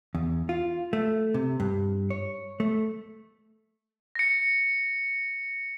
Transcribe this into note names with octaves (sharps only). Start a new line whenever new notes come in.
E2
F4
A3
C3
G2
C#5
A3
A#6 C#7